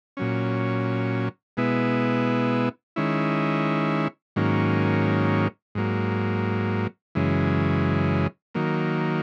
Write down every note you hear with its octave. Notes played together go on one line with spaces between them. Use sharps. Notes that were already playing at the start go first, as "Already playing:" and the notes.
A#2 F#3 C#4
B2 G#3 B3 E4
D#3 G#3 C#4 E4
G#2 D#3 F#3 A#3 C#4
G#2 F#3 A#3
F#2 C#3 E3 G#3
D#3 F#3 A#3